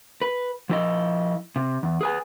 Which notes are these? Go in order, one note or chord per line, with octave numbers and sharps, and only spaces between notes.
B4
F3 E4 D#5
C3
E2
G#4 B4 G#5